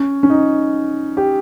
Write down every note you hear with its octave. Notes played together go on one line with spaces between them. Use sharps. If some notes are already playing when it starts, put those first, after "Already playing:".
Already playing: C#4
C#4
D#4
G4